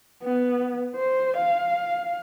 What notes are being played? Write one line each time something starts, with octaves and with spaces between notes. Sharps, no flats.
B3
C5
F5